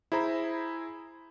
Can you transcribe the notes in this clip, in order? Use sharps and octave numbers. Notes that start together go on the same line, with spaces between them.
E4 G#4 C5 A#5 B5